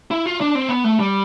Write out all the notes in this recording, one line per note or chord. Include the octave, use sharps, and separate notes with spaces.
E4
F4
D4
C4
B3
A3
G3